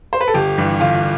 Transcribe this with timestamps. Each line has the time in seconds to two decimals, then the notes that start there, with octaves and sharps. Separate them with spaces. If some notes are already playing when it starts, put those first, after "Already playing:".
0.13 C5
0.21 B4
0.28 A4
0.34 G1 G4
0.58 G2 E3
0.80 G1 F4
0.96 F4